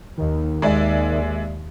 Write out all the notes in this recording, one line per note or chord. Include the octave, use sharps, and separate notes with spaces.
D#2 D#3
D#2 G#3 D5 E5